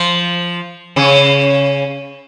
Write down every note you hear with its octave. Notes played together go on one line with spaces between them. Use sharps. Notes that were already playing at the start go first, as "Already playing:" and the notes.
Already playing: F3 F4
C#3 C#4